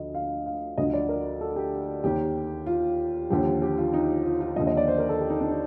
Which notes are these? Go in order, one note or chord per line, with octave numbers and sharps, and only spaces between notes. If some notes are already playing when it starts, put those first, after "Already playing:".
Already playing: D2 D3 F3 D#5
F5
F5
D2 D3 F3 D#5
D5
A#4
A4
G4
D#2 D#3 G4
F4
D#2 D3 F3 G4
G4
F4
D#4
F4
F4
D#2 D3 F3 D#5
D#5
D5
C5
A#4
A4
G4
D#4
D4
D#4